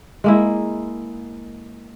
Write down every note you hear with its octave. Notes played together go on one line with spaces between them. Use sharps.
G#3 A#3 E4